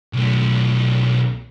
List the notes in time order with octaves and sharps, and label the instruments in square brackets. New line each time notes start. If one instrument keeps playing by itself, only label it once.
[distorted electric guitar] B1 A3